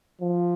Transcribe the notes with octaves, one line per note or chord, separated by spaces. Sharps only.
F3